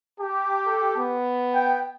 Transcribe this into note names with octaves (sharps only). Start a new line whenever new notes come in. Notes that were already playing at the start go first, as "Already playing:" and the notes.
G4 A5
A4
B3
G5